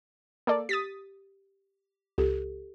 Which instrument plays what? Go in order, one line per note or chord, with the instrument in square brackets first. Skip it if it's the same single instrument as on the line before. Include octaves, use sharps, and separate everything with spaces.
[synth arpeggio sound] A#3 A4 D5
[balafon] G4 [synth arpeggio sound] D#6 A6 B6
[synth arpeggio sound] C#2 [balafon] G4 A4